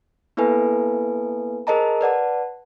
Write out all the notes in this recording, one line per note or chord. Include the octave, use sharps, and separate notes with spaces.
A#3 B3 E4 A4 B4 G#5
G#4 A#4 C5 D#5 A5 A#5
B4 D5 F#5 A5